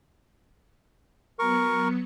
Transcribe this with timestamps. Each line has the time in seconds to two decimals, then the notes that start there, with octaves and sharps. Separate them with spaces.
1.39 F#3 B3 A#4 C#6 C#7